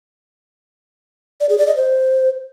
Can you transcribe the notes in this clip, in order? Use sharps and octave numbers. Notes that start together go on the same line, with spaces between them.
D5
G#4
D5
D#5
C5